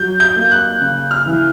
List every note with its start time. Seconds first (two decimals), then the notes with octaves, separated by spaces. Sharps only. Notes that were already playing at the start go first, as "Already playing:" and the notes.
Already playing: F#3 G6
0.20 G6
0.36 A#3
0.51 F#6
0.81 C#3
1.11 F6
1.26 E3